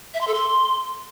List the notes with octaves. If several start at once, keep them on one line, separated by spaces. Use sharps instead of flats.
E5
C6
A4
C6